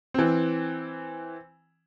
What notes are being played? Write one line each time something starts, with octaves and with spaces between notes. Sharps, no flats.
E3 C4